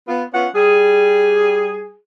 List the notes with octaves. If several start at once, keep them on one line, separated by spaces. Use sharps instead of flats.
B3 F4
B3 C#4 F4 F#5
G3 G#4